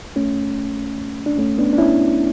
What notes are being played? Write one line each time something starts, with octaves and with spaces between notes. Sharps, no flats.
A3 C#4
D4
A3 C#4
B3 D4
D4
C#4 E4